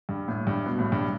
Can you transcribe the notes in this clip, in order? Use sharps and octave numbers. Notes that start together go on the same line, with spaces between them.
G2
A2
G2
B2
A2
G2